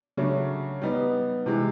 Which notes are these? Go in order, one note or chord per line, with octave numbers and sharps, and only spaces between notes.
C#3 F#3 A3 D4
G3 B3 D#4
C3 E3 G#3